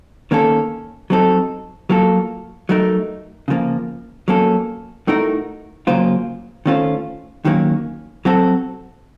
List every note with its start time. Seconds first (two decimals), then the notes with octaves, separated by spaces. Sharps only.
0.31 D#3 A#3 C#4 A4
1.10 F#3 C4 D#4 A4
1.90 F#3 A#3 F4 A4
2.69 F#3 A3 D#4 A#4
3.48 C#3 F3 A#3
4.28 F#3 A#3 C#4 A4
5.07 A2 A3 D#4 F#4 A#4
5.87 C#3 F#3 A#3 F4 C5
6.66 D#3 A3 C#4 F4 C5
7.45 D#3 F#3 A#3 C#4
8.25 F#3 C4 F#4 A4